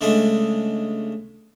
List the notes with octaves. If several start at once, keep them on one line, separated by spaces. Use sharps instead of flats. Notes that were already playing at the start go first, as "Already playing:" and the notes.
C#3 G#3 A3 D4 A4